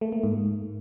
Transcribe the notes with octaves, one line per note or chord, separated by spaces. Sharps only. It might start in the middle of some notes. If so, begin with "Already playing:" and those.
A3
A#3
G#2